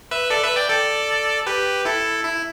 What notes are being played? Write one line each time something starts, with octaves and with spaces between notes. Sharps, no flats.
B4 E5
A4 D5
B4 E5
D5 G5
A4 D5
G4 B4
E4 A4
E4